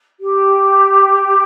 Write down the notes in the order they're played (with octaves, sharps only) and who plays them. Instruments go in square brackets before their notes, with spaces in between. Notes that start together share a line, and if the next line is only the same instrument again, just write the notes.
[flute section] G4